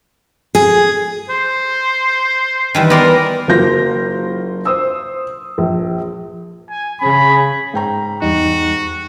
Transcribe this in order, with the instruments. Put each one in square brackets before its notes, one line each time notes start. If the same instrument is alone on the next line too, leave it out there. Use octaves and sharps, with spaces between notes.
[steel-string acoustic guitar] G#4
[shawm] C5
[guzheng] D#3 E3 G3
[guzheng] B3 D5 C6 [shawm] A#4
[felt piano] F#1 F#3 A#3 F4 G6 A#6
C5 D#6 E6
A#1
[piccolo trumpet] G#5
[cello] C#3 G#4 [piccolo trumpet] B5
[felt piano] G#2 G5 A#5
[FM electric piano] E2 G3 D#4 [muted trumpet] F#4